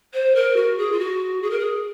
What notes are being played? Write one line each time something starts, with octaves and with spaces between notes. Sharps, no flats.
C5
A#4
F#4
G#4
F4
F#4
G#4
A#4
G#4